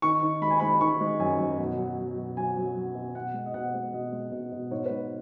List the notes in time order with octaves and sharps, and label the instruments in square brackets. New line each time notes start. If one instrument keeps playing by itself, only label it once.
[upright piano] D#3 C#6
D#3
G#3 B5
G#5
G#3 B5
D#3 C#6
G#3
F#2 G#5
F#2
B2
F#3
F#3
B2
F#3 G#5
F#3
F#3
B2
B2 F#5
G#3
D#5
B2 F#5
G#3
B2 D#5
G#3
B2
B2
G#2 C#5
G#3 B4